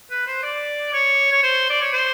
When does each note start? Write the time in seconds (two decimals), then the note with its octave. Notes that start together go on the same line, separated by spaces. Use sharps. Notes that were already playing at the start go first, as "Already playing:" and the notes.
0.11 B4
0.27 C5
0.43 D5
0.94 C#5
1.32 C#5
1.43 C5
1.70 D5
1.81 C#5
1.93 C5